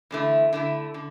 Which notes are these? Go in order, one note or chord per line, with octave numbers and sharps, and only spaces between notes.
E2 D3 A3 E4
D3 A3 E4
D3